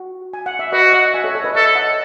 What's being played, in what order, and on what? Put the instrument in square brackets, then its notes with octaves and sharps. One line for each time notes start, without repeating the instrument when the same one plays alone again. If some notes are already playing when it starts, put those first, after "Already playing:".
Already playing: [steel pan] F#4
G#5
F#5
E5
[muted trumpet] F#4 [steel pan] B4 D#5
[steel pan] D#5 F#5
E5 G#5
A4 C#5
A4 C#5
B4 D#5
[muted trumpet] A4 [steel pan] C#5 E5
[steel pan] D#5 F#5